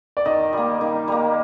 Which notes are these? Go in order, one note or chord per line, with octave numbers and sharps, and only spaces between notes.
D5
D#3 D#5
G3 A#3
D#3
G3 A#3